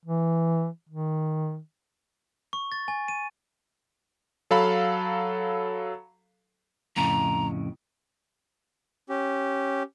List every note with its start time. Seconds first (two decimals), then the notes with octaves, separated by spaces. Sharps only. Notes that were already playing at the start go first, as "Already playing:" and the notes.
0.05 E3
0.89 D#3
2.53 C#6
2.72 A6
2.88 G#5
3.08 D#7
4.51 F#3 A4 F5 B5
6.96 F2 A2 C#3 A#5
9.09 C#4 G4